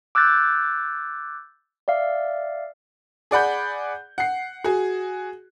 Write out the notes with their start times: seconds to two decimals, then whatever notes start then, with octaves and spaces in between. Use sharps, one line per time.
0.15 D6 E6 F#6 G6 A6
1.88 D5 E5 F5
3.31 G#4 D5 F#5 B5 G6
4.18 F#5 C7
4.64 F#4 G#4